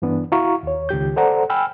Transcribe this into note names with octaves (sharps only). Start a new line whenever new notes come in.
G2 E3 B3 D4
E4 F#4 F5 A#5 C#6
D#2 C#5
C#2 D#3 G4 G6
A4 C5 D5 F#5 A#5
G5 G#5 B5 E6 F6